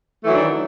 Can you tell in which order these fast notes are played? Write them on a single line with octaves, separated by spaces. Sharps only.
A3 E3 F#3 D4 D#3